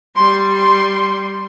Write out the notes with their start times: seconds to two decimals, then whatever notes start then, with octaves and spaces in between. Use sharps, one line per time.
0.16 G3 C6
0.54 C6